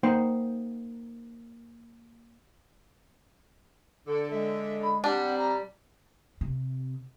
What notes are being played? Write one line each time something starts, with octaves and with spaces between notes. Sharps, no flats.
A#3 D#4 C5 F#5 G5 C6
D3 A4
G#3 E5
B5
C3 G3 D4 F#5
C4
A#5
C3